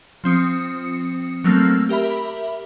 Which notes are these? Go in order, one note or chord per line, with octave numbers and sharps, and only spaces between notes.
F3 C4 D#6 C#7
F#3 A3 A#3 C4 E6 F6
G4 A#4 E5 B5